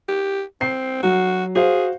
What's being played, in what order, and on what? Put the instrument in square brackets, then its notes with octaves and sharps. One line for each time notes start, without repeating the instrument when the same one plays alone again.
[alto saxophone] G4
[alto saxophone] C4 [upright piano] C7
[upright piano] F#3 [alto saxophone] F#4
[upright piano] F#4 C5 F5 [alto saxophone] G#4